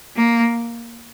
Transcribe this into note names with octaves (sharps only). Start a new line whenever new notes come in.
A#3